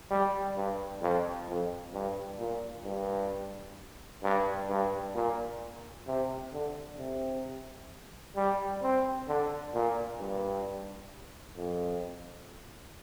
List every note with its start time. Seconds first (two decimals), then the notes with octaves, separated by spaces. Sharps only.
0.11 G3
0.56 G2
1.02 F2
1.49 F2
1.94 G2
2.39 A#2
2.85 G2
4.23 G2
4.69 G2
5.15 A#2
6.07 C3
6.53 D3
6.98 C3
8.36 G3
8.82 C4
9.28 D3
9.74 A#2
10.20 G2
11.57 F2